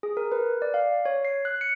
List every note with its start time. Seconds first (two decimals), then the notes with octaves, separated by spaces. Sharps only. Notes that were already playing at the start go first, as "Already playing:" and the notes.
0.03 G#4
0.17 A#4
0.32 B4
0.62 D5
0.74 F5
1.05 C#5
1.25 C7
1.45 F#6
1.61 C#7